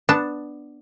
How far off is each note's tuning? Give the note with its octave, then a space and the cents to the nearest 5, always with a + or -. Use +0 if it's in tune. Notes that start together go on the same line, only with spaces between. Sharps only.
B3 +0 D4 +5 A5 +0